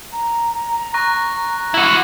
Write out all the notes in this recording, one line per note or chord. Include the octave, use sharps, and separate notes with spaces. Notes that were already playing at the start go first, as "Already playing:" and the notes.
A#5
C#6 F#6 A#6
E4 F#4